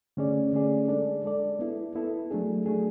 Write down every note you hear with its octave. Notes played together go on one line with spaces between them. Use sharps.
D3 A3 C#4 G#4 D5
D3 A3 C#4 G#4 D5
G#3 D4 A4 D5
G#3 D4 A4 D5
B3 E4 A4
B3 E4 A4
F#3 A3 D4 G#4
F#3 A3 D4 G#4